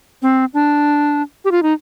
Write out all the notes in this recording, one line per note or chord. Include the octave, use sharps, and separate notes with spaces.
C4
D4
G4
F4
D#4